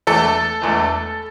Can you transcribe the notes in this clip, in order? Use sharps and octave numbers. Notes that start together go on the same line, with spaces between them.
E1 E2 E3 A3 A4
E1 E2 E3 A3